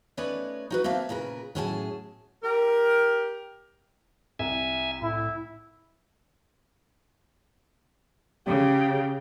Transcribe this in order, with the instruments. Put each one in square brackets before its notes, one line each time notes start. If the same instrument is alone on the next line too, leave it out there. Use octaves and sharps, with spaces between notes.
[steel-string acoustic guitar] A3 C#4 D#4 B4 C#5 D5
D#4 F#4 B4
A#3 C4 E5 F5 A5
A#2 C#3 A#4 B4
A2 F#3 C#4 G#4 F#5 A5
[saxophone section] G4 A#4
[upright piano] C2 [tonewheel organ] E5 G#5
[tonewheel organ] A2 [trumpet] E4
[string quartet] C#3 [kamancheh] G4